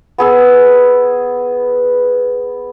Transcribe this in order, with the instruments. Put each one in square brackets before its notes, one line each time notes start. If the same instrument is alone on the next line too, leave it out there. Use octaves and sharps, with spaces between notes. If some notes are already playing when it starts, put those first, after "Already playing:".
[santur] B3 G#4 E6